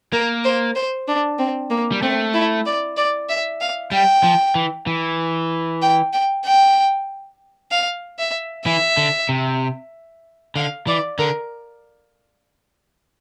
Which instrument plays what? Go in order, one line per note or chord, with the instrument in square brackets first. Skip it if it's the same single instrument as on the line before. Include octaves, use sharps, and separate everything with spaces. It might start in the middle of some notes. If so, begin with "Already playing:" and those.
[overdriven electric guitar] A#3 [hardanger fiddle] A#4
[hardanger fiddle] C5
C5
D4
C4
A#3
[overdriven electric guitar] G3
[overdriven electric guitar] A3 [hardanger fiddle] C4
[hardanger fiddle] E4
D5
D5
E5
F5
[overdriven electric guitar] G3 [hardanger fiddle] G5
[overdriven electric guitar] F3
E3
E3
[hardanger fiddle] G5
G5
G5
F5
E5
[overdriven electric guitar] E3 [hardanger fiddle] E5
[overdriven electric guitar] D3
C3
[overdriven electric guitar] D3 [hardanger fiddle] F5
[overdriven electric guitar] E3 [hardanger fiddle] D5
[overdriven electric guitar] D3 [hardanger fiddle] A#4